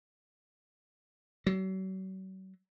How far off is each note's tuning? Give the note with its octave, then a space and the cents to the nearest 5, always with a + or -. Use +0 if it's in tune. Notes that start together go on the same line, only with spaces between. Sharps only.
F#3 +40